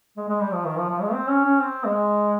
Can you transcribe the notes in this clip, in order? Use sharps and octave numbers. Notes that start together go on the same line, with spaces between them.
G#3
G#3
G3
F3
D#3
F3
F3
G#3
C4
C#4
C#4
C4
G#3